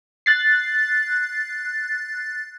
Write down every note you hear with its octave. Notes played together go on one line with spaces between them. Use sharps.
F#6 A6 C7